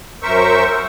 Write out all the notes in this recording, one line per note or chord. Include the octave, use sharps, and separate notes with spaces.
F#2 A#4 C5 E5 C#6 E6